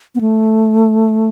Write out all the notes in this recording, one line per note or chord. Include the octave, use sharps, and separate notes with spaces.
B3
A3